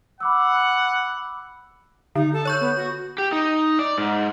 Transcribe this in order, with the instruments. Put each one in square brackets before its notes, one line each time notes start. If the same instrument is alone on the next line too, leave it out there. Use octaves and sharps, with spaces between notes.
[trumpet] F#5 [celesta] B5 D6 E6
[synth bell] D3 [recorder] D#4
[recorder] A4
[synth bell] C#5 C#6 G6
[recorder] B3
F#4
[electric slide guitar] G4
D#4
D5
G#2